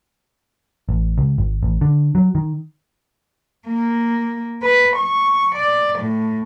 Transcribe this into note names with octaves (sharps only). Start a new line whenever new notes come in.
A1
C#2
G#1
A1
D3
F#3
D#3
A#3
B4
C#6
D5
A2